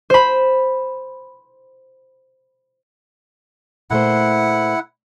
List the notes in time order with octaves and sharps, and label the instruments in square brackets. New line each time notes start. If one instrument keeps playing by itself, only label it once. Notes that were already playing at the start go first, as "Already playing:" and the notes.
[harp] C5 B5
[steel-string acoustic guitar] A#2 A3 C5 [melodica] E4 F#5